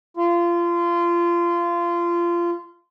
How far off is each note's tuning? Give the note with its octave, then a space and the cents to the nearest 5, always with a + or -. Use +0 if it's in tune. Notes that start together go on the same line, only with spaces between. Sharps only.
F4 -25